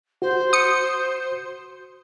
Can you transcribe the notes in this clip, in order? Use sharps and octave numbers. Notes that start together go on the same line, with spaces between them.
F#4 C5
D#6 C#7